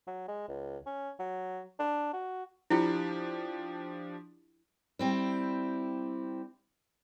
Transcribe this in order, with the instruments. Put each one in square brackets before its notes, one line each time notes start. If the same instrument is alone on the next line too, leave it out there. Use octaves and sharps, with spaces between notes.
[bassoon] F#3
G#3
C#2
C#4
F#3
D4
F#4
[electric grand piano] F3 D4 G4 [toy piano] E4 F4 G5
[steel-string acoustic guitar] G3 C4 E4